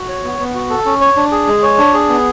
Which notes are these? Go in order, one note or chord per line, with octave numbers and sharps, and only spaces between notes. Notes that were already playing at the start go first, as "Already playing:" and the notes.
Already playing: F#4
C#5
B3
B3
F#4
A4
C#4
C#5
D4
G#4
G#3
C#5
D4
G#4
B3